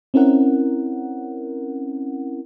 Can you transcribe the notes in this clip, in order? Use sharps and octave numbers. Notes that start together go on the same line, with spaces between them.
C4 C#4 E4 A#4 F#5